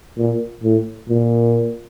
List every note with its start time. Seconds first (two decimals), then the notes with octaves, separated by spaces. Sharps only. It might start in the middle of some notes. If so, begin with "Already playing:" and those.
0.18 A#2
0.64 A2
1.10 A#2